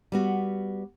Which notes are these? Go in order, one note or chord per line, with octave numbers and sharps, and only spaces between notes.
G3 B3 F#4